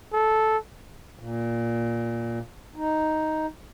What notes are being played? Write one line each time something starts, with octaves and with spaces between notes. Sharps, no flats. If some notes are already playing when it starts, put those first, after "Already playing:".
A4
A#2
D#4